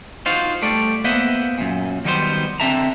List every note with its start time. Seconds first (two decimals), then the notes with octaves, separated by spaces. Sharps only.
0.26 D#4 F4 F#4 C5 F5
0.62 G3 A3 D5
1.04 A#3 B3 C5 D#5 E5 F#5
1.58 F#2 A#2
2.05 D#3 F#3 G3 B3 D#4 C5
2.60 D3 C4 A4 E5 A5 A#5